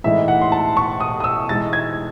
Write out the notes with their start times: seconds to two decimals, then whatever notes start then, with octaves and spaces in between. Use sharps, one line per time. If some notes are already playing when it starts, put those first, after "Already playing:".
0.04 A2 E3 G#3 D#4 E5
0.28 F#5
0.42 C6
0.52 A5
0.77 C#6
1.00 D#6
1.20 D#6
1.24 E6
1.49 E3 G#3 D#4 A6
1.73 G#6